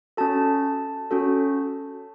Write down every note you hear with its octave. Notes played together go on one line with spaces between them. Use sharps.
C#4 F#4 A4 A5
C#4 F#4 A4